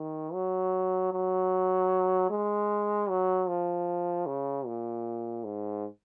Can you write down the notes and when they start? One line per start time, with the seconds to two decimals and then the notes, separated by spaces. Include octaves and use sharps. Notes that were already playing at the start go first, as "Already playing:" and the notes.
Already playing: D#3
0.33 F#3
1.13 F#3
2.30 G#3
3.09 F#3
3.48 F3
4.26 C#3
4.66 A#2
5.44 G#2